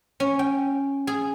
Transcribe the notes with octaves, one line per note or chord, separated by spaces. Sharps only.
C#4
G5
G#4